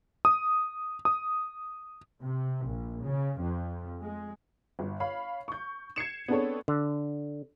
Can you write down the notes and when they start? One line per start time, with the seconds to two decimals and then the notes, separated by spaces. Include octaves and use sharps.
0.25 D#6
1.05 D#6
2.22 C3
2.66 A#1
3.02 C#3
3.40 F2
4.01 G#3
4.79 G1
5.00 C#5 F5 B5
5.48 C#6 G6
5.96 G#6 C7 C#7 E7
6.28 B3 C4 D4 G#4 A4 C#5
6.68 D3